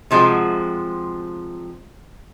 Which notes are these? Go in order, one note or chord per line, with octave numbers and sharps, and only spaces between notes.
C3 F3 G#3 F#4